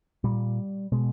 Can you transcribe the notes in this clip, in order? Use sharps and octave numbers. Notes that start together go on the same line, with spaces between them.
A#2 G3
B2 G#3